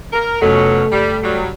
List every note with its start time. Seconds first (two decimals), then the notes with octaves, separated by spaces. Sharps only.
0.13 A#4
0.42 F1 B2 F#3 A3 C#4
0.92 F#1 G3
1.23 F#3 G3